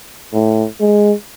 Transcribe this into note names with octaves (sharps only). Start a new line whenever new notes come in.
A2
G#3